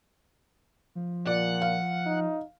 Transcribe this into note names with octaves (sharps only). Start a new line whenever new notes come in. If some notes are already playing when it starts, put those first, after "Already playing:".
F3
A#2 D5 F#5
F5
D#4